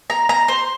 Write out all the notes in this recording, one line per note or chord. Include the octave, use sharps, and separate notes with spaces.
A#5
A#5
C5